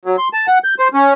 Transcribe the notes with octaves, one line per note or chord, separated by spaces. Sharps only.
F#3
C6
A5
F#5
G6
C5
C#4